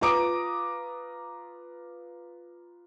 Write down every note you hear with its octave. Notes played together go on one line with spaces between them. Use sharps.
F4 B4 A#5 D6 D#6 D7